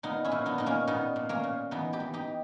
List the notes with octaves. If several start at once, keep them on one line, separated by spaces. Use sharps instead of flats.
A#2 B3 D#4
C#4 E4
A#2
B3 D#4
A#2 D#4
A#3 C#4
A#2 B3 D#4
A#2
A#3 C#4
A#2
E3 B3 D#4
D#4 G4
E3
D#4 G4